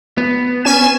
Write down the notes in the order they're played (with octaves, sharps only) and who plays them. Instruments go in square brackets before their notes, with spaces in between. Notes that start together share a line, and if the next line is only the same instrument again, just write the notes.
[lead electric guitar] B3
[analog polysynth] C#4 G#5 E7